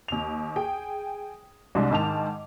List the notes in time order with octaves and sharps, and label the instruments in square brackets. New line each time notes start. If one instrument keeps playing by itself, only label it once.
[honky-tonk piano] D#2 F7
G#4 G5
C2 C3 G#3 D4
G#2 D#3 A5 D6 F7